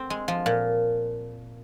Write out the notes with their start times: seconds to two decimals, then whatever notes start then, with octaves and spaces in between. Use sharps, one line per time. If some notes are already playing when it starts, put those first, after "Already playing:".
Already playing: C4
0.10 G#3
0.28 F3
0.46 A#2